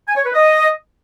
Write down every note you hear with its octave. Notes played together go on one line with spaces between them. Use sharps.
G#5
C#5
B4
D#5